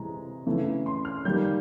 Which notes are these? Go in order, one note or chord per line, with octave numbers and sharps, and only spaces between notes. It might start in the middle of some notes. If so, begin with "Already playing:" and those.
Already playing: C3 E3 G#3 A#5
C#3 E3 A3
C6
F6
D#3 G3 A#3 G6